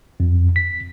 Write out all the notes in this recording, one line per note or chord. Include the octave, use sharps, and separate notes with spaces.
F2
B6